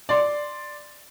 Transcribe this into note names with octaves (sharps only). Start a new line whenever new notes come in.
D5 C6